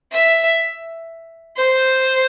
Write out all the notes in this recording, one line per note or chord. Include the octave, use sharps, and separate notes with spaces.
E5
C5